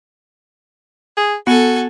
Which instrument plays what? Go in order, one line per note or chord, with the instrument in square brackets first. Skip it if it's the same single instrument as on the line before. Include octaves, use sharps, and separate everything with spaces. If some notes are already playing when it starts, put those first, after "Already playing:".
[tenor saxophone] G#4
[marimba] B3 [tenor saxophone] F#4 [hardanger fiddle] A4 G#5